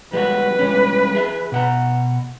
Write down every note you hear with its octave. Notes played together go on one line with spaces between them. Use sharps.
G3 G#3 F#4 B4
G3 G#3 C#4
G#4 E5
B2 F#5 A#5